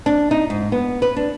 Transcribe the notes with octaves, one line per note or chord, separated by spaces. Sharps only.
D4
D#4
G#2
B3
B4
D4